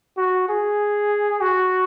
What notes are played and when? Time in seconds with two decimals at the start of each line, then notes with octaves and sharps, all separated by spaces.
0.17 F#4
0.49 G#4
1.41 F#4